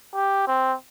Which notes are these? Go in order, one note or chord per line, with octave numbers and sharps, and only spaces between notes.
G4
C4